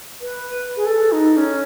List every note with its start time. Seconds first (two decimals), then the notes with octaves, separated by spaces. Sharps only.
0.21 B4
0.77 G#4
0.86 A4
1.12 D#4
1.37 C#4